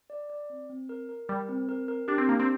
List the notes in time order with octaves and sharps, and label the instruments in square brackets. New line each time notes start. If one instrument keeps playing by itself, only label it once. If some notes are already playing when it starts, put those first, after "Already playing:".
[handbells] D5
D5
C4
C4
A#4
A#4
[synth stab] G3 [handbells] A#4
[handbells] C4
A#4
A#4
[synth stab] D4 [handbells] G4
[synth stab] C4
[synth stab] A#3 [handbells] D4
[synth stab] C4